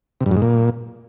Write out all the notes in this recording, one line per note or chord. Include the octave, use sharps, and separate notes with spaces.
C3
G2
F#2
G#2
A#2